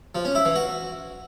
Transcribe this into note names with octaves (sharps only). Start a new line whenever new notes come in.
F3
C#4
E4
E3
F#4